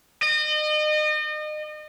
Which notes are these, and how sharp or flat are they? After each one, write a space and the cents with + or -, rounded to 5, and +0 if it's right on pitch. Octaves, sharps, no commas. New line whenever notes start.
D#5 -35